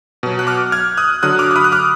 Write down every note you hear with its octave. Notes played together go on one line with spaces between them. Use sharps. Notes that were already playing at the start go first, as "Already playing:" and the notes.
B2 F#3
F#6
D6 F6
F6 G#6
D#6 F#6
D3 F#3 D#6 F#6
D6 F6
D6
B5 D#6
F#6
D6 F6